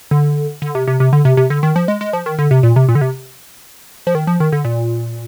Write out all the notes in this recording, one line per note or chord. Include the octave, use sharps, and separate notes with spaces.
D3
D3
C3
C3
C3
D3
C3
C3
D3
D#3
F3
G#3
G#3
F3
D#3
D3
C3
A#2
C3
A#2
D3
C3
F3
D#3
F3
D#3
D3
A#2